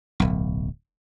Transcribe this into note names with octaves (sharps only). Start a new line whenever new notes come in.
D1 B1